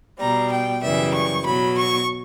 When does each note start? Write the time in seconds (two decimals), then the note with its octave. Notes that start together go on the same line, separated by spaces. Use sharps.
0.19 B2 G3 A#5
0.51 G5
0.82 F#2 C#3 E3 G3 E5
1.14 C#6
1.46 B2 F#3 B5
1.77 C#6